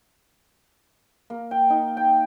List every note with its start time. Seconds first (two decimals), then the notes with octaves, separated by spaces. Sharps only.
1.30 A#3
1.51 G5
1.70 D#4
1.97 G5